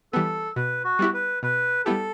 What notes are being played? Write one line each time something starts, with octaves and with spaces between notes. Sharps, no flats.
E3 G3 B3 A4
B2 B4
F#4
G3 B3 E4 G4
B4
B2 B4
G3 B3 E4 G4 A4